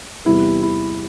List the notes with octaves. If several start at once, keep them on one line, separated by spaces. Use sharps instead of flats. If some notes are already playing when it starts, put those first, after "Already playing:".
E2 C3 G3 B3 E4
E4